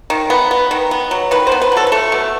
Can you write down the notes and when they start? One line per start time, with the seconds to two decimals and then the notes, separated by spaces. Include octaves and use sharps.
0.10 D#3
0.30 B3
0.51 B3
0.71 D#3
0.91 B3
1.11 F#3
1.31 D#3 B4
1.47 B3 C5
1.61 B4
1.72 F#3 A4
1.87 B4
1.92 A3 A4
2.12 B2